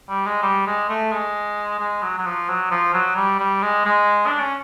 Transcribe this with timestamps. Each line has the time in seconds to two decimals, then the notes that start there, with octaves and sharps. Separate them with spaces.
0.10 G3
0.26 G#3
0.43 G3
0.67 G#3
0.89 A3
1.12 G#3
1.79 G#3
2.02 F#3
2.18 F#3
2.26 F3
2.49 F#3
2.71 F3
2.94 F#3
3.16 G3
3.39 G3
3.62 G#3
3.86 G#3
4.27 D4
4.40 C#4